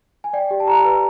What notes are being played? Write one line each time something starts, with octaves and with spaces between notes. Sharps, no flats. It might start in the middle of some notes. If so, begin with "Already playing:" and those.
G#5
D5 G5
G4
A5
G4 A#5
B4